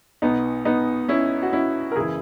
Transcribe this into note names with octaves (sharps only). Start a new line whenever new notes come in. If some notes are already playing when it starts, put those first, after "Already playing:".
B1 B2 B3 D#4
B3 D#4
C#4 E4
F#4
C#4 E4
A#4
F#1 C#3 E3 E4 G#4